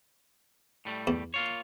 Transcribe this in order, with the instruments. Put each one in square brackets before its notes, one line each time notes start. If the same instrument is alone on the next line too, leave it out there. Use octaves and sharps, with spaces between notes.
[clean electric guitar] A2 G3 A3
[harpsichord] E2
[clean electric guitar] A#3 F4 C#5